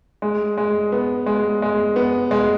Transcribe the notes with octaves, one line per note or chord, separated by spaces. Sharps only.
G#3
G#3
B3
G#3
G#3
B3
G#3